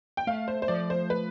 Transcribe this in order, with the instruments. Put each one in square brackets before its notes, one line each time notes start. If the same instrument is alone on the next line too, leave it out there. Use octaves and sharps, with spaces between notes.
[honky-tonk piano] G5
[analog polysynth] A3 [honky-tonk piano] F5
[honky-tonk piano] C5
C5
[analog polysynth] F3 [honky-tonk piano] D5
[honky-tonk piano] C5
B4